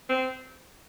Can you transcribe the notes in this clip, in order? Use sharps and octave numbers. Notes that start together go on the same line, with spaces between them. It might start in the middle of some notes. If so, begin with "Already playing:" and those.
C4